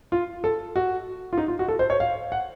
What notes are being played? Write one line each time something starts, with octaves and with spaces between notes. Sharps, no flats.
F4
A4
F#4
F4
D#4
F4
F#4
A4
C5
C#5
F5
F#5